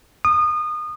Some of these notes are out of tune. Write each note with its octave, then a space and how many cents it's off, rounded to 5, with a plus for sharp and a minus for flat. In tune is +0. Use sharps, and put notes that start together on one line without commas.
D#6 -30